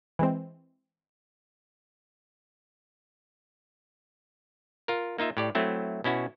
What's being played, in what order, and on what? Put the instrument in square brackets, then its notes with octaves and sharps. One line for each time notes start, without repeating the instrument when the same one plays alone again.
[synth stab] E3 G#3 C4
[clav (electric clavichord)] F4 A#4
A#3 D#4 F4 E5
A2 G4 D5
F#3 A3 C4 E4
B2 C#4 E4 F#4